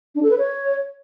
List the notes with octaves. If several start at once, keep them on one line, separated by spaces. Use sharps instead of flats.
D4
A4
B4
C#5